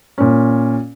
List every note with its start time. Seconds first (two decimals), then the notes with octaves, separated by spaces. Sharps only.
0.18 A#2 C#4